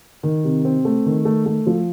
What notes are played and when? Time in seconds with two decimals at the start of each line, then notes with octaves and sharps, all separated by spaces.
0.23 D#3
0.44 C3
0.65 C4
0.85 A3
1.06 D#3
1.25 A3
1.46 A3
1.67 F3